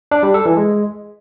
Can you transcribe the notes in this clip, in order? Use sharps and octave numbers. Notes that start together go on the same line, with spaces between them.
D4
G3
A4
E3
G#3